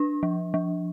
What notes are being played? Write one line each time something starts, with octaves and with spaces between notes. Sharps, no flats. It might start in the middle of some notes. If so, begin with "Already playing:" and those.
Already playing: D4
F3
F3